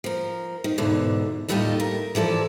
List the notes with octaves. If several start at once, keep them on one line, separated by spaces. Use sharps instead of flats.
F3 A#4
D#3
E2 G#2 B2 D3
D#2 A2 G3 F4 G#4 D#5
A#4
E3 F3 A4 D5